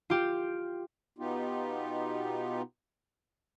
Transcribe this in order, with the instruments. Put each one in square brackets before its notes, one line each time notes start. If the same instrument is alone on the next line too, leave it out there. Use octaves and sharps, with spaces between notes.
[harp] F4 G4
[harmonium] B2 B3 D#4 F4 G4